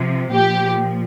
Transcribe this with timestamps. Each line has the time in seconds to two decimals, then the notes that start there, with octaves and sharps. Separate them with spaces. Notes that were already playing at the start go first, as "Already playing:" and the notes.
Already playing: C3 F3
0.32 A#2 F3 G4